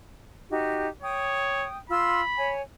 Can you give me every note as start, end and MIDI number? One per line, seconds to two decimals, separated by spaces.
0.50 0.87 63
0.50 0.87 66
0.50 0.87 67
1.02 1.68 73
1.02 1.77 79
1.02 1.77 87
1.90 2.21 65
1.90 2.55 83
1.90 2.21 84
1.90 2.21 88
2.37 2.62 73
2.37 2.62 80